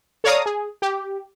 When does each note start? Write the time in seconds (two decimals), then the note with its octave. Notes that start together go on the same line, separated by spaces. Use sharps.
0.24 A4 C#5 D5 F5 A#5 D#6
0.46 G#4
0.82 G4